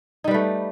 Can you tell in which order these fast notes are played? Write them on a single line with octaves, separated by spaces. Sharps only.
D#4 G3 B4 A3